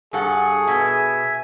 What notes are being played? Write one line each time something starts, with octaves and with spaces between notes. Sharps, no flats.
G2 G#4 A4 F#5 C#6
B2 E5 G#5